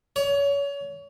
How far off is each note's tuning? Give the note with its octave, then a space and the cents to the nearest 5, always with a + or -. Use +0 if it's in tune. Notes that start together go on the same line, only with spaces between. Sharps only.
C#5 +30